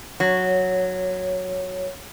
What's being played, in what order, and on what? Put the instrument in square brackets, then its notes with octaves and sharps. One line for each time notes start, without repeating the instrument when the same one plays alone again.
[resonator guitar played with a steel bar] F#3 [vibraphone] C#5